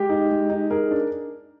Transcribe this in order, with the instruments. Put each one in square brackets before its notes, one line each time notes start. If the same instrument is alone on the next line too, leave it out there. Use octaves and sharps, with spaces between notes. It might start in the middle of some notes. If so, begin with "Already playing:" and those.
Already playing: [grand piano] G#3 [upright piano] G4
[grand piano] D#4
G#3
D#4
[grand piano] G#4 [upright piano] A#4
[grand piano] D4